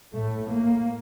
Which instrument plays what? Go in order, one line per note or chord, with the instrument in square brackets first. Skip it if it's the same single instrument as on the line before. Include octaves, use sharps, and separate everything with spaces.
[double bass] A2 [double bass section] A3
[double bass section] A#3